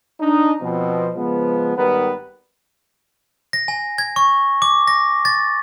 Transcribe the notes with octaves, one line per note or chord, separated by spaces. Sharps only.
D4 D#4
B2 F3 C4
C#3 F3 G#3 B3
G#1 D#3 G3 B3 A#4 B4
A#6
G#5
G#6
C#6
D6
A#6
A6